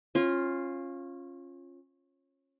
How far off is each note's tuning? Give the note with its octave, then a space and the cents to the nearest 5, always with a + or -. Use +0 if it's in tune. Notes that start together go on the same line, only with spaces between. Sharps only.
C#4 -25 F4 +0